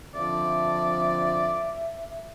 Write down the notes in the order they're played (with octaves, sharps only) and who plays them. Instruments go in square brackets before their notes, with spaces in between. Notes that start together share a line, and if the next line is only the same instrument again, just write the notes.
[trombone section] F2 D3 F3 [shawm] D5 [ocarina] E5